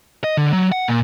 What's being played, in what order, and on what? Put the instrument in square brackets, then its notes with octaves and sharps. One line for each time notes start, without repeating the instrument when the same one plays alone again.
[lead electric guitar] D#5
D3
F#3
F#5
A#2